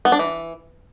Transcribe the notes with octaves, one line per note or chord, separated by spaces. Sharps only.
B3
D4
E3